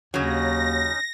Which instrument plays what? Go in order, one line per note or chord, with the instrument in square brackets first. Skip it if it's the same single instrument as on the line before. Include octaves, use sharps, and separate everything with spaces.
[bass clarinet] D#2 [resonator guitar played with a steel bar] C#3 F#3 [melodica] C#4 D#4 [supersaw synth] A#6